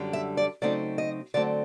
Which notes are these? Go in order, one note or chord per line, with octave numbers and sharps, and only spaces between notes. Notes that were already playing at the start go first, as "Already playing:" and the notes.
Already playing: F#2 D3 G3
E5
D5
C#3 F#3 A3 C4 D#4 D5
D#5
D3 F#3 A3 C4 D5